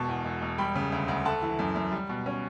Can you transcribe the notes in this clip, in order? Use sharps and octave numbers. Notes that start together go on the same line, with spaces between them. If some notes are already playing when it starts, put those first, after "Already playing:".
Already playing: E1 B2 A5 C#6
E2
E1
E1
G3 G5 B5
C#3
D2
D2
A3 F#5 A5
E3
F#2
F#2
G3
B2
C#4